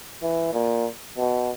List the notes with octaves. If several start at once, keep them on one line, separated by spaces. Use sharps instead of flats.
E3
A#2
B2